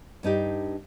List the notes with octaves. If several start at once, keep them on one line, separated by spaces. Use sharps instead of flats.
G2 D4 D#4 G4